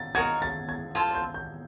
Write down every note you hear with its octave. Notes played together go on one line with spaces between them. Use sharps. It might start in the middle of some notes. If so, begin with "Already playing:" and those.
Already playing: A6
D#4 F#4 A#4 G#6
A6
G#6
F4 A4 C5 G#6
G6
G6